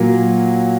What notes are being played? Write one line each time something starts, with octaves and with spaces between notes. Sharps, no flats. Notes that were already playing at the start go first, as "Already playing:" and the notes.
Already playing: A#2 F#3 A#3